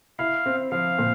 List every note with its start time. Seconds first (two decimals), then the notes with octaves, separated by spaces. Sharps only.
0.19 E4 F5
0.46 C4
0.71 F3 F5
0.99 A#2